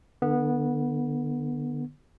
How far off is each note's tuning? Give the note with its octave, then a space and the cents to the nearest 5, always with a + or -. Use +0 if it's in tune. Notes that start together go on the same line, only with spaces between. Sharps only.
D3 +25 B3 -15